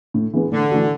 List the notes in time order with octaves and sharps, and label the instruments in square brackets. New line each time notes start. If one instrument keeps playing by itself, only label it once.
[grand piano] A2
E3 G#3 B3
[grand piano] A2 [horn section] D3
[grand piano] E3 A3 D4 F#4